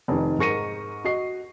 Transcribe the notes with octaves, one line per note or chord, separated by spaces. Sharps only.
F1 D#3
G#2 A#4 C#6 A#6 C#7 D#7
F#4 D#5 C7